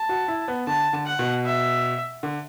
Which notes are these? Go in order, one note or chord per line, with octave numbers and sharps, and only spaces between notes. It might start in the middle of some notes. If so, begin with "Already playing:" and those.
Already playing: A5
F#4
E4
B3
D3 A5
D3
F#5
B2
E5
D3